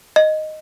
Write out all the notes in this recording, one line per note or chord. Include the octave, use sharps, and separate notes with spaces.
D#5